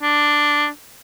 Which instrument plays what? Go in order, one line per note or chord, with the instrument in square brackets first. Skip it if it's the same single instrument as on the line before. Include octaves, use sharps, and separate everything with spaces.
[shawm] D4